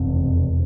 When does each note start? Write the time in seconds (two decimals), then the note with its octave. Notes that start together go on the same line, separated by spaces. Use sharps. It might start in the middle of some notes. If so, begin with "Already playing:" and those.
Already playing: F1 E2 B2 C4